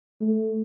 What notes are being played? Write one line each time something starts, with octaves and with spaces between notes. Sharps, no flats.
A3